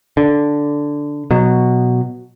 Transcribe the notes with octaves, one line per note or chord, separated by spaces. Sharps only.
D3
B2 F#3